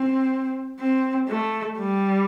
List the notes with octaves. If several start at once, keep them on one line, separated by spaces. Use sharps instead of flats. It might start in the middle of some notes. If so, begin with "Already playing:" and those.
Already playing: C4
C4
A3
G3